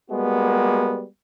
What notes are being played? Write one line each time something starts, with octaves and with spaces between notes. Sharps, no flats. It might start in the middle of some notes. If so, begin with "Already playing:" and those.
G3 G#3 A#3 B3 F#4